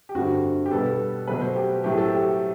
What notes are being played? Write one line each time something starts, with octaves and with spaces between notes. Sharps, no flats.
G4
G2 D3 A3 C4 F#4
G4
B2 G3 B3 A4
B2 F#3 A3 B4
C5
G4
A2 F#3 A3 C4 G4
A4
G4